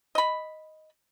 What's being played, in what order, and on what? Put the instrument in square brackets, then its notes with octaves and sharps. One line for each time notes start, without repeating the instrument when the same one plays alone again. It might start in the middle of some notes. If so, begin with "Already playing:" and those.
[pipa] D#5 B5